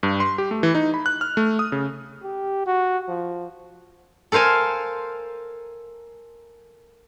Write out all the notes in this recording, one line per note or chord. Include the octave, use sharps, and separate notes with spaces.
G2
C6
G4
A3
E3
D#4
B5
F#6
F6
A3
D#6
C#3
G4
F#4
F3
A4 A#4 C5 F5 G#5